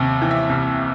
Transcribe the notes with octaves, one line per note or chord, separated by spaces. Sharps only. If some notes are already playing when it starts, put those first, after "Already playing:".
Already playing: D#2 C3
E3
E5
C2